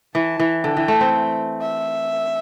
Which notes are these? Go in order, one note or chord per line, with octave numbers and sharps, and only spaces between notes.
E3 A5
E3
D3 G5
E3
A3
C4
E5